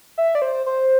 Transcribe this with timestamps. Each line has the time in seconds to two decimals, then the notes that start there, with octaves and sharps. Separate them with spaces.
0.18 E5
0.35 D5
0.42 C5
0.66 C5